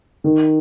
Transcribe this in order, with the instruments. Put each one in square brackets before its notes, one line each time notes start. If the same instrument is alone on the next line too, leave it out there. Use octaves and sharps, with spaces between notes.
[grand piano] D#3